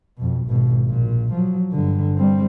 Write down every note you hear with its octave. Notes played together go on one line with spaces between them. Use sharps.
F2 B2
G#1 B2
A#1 A#2
F3 F#3
G2 D3
G3 C4